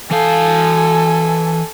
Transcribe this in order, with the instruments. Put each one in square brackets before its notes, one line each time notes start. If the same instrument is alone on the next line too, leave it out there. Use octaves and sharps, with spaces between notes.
[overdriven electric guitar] E3 F5 [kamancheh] A4 G#5